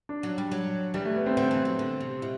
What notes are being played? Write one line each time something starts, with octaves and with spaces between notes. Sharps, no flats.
D4
F#3
G3
F#3
E3 G3
A3
B3
C4
D3 C4
E3
F#3
D3
C3
B2 E4